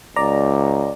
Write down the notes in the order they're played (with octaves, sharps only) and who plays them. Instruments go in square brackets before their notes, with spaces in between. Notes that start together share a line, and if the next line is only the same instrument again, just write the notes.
[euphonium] C#2 [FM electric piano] D5 A#5